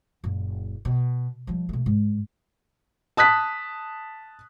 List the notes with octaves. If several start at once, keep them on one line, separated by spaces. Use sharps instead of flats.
F#1 A#2
B2
F3 G3
B2 A3
G#2
A5 D#6 F#6 B6